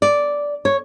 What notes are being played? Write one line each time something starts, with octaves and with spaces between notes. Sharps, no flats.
D5
C#5